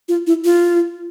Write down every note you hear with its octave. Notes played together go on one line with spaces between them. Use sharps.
F4
E4
F4